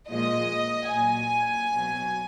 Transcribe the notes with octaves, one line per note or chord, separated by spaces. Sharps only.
A#2 F3 G#3 D#5
A#2 F#3 G#5
B2 F#3